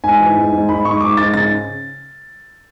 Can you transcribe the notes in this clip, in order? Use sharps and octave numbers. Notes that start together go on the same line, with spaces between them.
G#2 G#5
E3
G#2
G#2
G#2 B5
G#2 C#6
G#2 D6
G#2 A6
C#3 A6